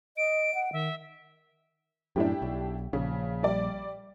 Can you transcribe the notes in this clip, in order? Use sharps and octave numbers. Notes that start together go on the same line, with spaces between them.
D#5 D7
F#5
D#3 E5
F#2 A2 D4 E4 G4
B1
A#1 C#3
G3 D5